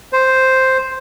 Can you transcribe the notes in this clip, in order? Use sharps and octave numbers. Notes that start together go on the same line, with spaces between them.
C5